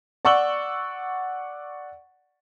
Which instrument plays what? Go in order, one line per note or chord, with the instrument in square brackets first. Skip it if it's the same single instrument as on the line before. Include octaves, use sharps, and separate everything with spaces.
[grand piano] D5 F#5 C#6 E6 F#7 G7